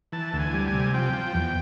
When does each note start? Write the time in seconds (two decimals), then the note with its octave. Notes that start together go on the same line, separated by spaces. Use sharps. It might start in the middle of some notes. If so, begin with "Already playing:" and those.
0.12 E3 A5
0.33 D2
0.39 G#5
0.53 G3
0.67 G#5
0.74 C3
0.94 F3 G5
1.13 F3
1.34 E2